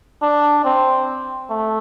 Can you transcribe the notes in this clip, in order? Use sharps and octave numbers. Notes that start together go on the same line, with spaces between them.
D4
C4
A3